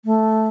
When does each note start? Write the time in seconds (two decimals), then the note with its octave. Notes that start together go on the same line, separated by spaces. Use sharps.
0.05 A3